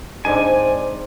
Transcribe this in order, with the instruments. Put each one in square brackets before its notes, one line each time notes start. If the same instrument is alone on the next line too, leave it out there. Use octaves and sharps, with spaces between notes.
[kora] G#2 D3 [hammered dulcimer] C4 D#4 [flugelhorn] D5 [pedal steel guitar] G#5